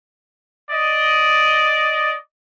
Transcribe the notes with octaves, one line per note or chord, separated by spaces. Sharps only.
D5 D#5